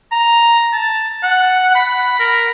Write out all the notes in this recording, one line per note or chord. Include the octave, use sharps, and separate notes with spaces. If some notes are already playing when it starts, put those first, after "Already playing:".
A#5
A5
F#5
B5
A#4